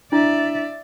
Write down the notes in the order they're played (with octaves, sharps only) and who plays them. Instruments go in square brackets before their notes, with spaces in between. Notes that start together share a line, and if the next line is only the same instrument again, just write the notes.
[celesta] D4 E4 [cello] D5 E5